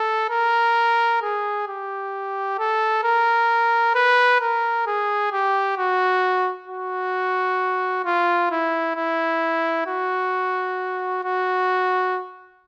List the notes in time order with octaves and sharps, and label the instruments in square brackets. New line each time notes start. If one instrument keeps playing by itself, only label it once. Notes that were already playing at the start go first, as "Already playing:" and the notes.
Already playing: [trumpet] A4
A#4
G#4
G4
A4
A#4
B4
A#4
G#4
G4
F#4
F#4
F4
E4
E4
F#4
F#4